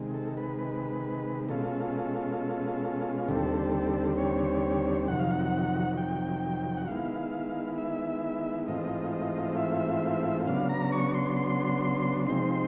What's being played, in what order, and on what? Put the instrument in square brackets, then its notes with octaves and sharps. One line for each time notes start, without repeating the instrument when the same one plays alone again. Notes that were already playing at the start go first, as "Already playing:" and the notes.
Already playing: [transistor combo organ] C3 D#3 G#3
A4
B4
B4
B2 G#3 C#4 F4 A4
D#2 D3 G3 C4 A4
C#5
F2 C3 D#3 F#3 F#5
F5
F#5
G5
F#5
D#3 G#3 B3 E4 F5
E5
G#2 E3 A3 C4 F4 D#5
D#5
E5
C#3 F#3 B3 D4 F5
A#5
C#6
C6
C6
C3 F3 G#3 C4 D#4 C6